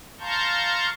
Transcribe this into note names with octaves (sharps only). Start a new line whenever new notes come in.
F5 A5 A#5 C6 C#6 G6